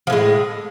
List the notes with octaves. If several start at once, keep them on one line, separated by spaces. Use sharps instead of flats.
A2 F3 G#3